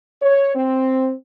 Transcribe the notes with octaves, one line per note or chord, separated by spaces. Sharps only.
C#5
C4